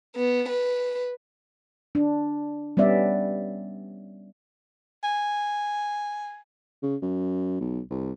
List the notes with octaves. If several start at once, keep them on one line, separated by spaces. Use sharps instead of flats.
B3
B4
D4
G3 B3 C#4 D5 E5
G#5
C#3
F#2
B1
C2